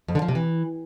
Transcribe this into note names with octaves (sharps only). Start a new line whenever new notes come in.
F2
D3
F3
C3
E3